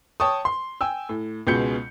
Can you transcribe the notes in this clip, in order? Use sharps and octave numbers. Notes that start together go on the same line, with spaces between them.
C#5 G5 A5 C#6 D#6
C6
G5 G#5 E6
A2
C#2 B2 G#3 G6 C#7